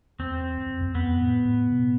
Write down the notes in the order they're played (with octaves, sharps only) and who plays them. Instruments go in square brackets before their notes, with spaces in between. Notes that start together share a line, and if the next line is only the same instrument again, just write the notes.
[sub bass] E2 [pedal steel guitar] C4
[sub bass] E2
F2
E2
[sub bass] F2 [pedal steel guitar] B3
[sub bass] A2
A2
B2